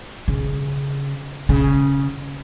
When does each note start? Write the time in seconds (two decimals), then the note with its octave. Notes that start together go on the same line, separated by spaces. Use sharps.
0.28 C#3
1.49 C#3